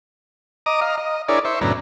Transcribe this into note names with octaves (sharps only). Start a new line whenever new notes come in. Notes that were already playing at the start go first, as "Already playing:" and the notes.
D#5 A#5 D6 D#6
D#5 F5 A#5
D#5
D4 E4 G#4 A#4 C#5 D5
C5 E5 C#6
F#2 A2 C#3 B3 D4 A#5